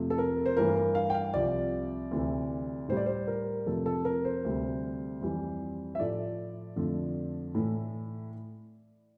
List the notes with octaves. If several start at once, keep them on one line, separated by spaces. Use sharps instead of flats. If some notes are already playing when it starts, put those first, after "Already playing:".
Already playing: F2 C3 F3 A3
A4
A#4
C5
G2 E3 A3 A#4
A#4
F5
G5
F5
C2 C3 F3 D5
D2 C3 E3 A3
A2 G3 C5
D5
C5
A#4
F2 C3 F3 A3 A4
A4
A#4
C5
D2 C3 G3
F2 E3 G3
E5
A2 F3 A3 D5
F2 D3 F3 A3
A2 E3 A3